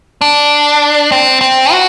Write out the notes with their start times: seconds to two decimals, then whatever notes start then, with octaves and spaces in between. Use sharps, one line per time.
0.21 D4
1.12 C4
1.41 C4
1.72 F#4